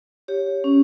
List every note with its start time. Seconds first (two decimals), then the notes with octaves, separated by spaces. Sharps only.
0.28 G4 C#5
0.64 C#4